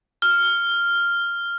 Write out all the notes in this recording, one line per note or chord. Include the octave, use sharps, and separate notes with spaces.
F6